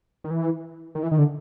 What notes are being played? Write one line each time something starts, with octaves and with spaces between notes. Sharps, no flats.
D#3
E3
D#3
E3
D#3
D3